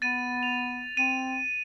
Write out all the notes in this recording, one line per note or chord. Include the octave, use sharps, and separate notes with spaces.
B3 A6 D#7
F7
C4 D#7